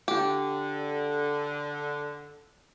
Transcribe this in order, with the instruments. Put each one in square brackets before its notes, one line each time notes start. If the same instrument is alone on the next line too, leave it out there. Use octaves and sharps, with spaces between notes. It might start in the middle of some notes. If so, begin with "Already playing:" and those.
[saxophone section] D3 [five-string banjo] G4